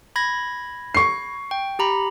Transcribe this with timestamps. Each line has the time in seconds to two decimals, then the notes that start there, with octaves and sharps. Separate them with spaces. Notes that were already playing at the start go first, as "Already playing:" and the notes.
0.16 B5 G#6 A#6
0.95 C#6 C7
1.51 G5
1.79 G4 A#5 B5